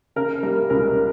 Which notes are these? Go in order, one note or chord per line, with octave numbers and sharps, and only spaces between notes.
C#3 A#4
G3 A#4
C#2 A#4